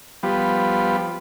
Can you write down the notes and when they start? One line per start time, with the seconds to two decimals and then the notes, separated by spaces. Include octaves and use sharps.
0.23 F3 G3 B3